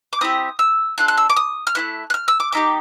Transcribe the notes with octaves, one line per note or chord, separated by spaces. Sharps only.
D6
C4 E4 G4 D#6
E6
D4 F4 A4 F#6
F#6
E6
D6
D#6
F6
A3 C4 E4 F#6
F#6
F6
E6
D6
B3 D#4 G4 D6